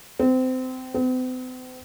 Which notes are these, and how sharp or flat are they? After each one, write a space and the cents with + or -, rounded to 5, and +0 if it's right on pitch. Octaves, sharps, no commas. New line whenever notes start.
C4 -25
C4 -45